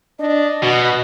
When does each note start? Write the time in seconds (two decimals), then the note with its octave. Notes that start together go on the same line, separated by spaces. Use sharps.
0.19 D4 D#5
0.63 B2 F#4